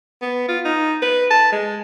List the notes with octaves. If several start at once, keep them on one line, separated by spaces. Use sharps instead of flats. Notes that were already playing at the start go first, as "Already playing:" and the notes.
B3
F4
D#4
B4
A5
G#3